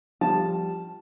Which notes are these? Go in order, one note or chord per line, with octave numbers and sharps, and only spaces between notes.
F3 G3 A5